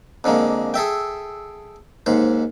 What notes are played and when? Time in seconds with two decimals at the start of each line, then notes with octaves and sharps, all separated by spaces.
0.24 F2 D3 G#3 A#3
0.74 G#4 A4 E5 G5
2.06 D#2 G#2 C5